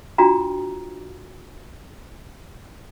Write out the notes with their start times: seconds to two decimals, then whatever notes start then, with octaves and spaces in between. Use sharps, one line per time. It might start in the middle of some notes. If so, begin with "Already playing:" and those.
0.18 D4 F4 F#4 G5 A#5